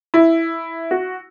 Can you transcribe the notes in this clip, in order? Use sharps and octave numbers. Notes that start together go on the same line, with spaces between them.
E4
F#4